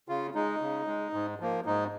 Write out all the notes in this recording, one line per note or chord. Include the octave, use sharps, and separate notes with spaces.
C#3 F4
G#3 D#4
C#3
G#3
G#2
F3 A#3
G#2 D#4